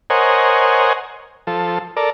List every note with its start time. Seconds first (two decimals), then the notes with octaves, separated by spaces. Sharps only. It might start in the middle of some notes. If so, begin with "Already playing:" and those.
0.10 A#4 C5 C#5 D#5 F#5 G#5
1.47 F3 A4
1.97 A4 A#4 D5